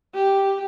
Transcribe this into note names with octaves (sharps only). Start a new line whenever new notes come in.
G4